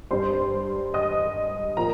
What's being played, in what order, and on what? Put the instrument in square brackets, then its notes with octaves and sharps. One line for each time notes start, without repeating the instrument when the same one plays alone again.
[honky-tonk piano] G2 G3 C5 C6
D#5 D#6
A#2 F3 A#4 A#5